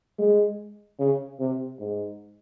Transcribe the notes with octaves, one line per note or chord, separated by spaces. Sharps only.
G#3
C#3
C3
G#2